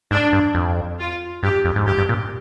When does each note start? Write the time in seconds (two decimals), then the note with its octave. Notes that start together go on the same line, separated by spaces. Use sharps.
0.11 G#2 D4
0.33 G2
0.55 F2
0.99 F4
1.43 G2 G4
1.65 F2
1.76 G#2
1.87 G2 G4
1.98 G2
2.09 A#2